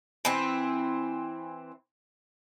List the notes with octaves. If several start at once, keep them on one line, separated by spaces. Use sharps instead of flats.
E3 C4